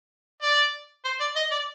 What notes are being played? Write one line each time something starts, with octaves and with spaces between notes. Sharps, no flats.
D5
C5
D5
D#5
D5